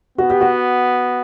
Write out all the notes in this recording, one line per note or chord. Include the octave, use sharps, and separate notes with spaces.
B3 F#4
G4
F#4